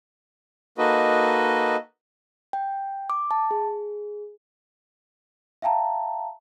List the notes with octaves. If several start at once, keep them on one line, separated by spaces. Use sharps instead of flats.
A#3 D#4 F#4 A4 B4 D#5
G5
D6
A5
G#4
E5 F5 G5 A5 A#5